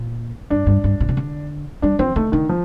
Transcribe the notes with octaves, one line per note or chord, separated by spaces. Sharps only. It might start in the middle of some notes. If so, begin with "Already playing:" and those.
Already playing: A#2
G2 D4
G2
G2
A#2
C3
D3
G3 D4
F3 C4
D#3 A3
D3 D#3
F3